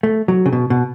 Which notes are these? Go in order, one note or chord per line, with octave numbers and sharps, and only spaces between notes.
A3
F#3
C#3
B2
B2